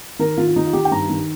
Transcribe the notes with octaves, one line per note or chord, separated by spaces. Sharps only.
D#3 A#4
D#3 F4
F4
D#3 D#4
F4
D#3 G4
G5
G2 A#5
D#3